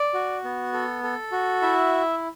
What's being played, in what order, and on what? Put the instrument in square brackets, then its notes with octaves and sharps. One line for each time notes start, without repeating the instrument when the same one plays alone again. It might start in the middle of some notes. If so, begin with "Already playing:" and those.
Already playing: [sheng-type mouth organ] D5
F#4
B3
A4
A4
F#4
E4 E5